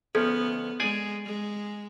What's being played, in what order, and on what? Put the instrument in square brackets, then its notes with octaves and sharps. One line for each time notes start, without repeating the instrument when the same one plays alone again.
[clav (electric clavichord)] D2 F3 C#4 [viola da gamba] B3 [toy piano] A4
[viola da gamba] G#3 [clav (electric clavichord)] G#4 D5 G#5
[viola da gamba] G#3